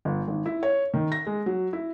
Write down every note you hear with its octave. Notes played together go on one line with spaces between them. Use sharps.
G1
G#1
E4
C#5
D#3
A#6
G#3
F#3
E4